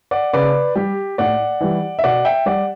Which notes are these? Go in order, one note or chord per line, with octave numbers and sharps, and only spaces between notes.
D5 F#5
C#3 B4 D5
G3 G4
A2 D5 F#5
E3 G3
E5
B2 D5 F#5
E5 G5
G3 D5 F#5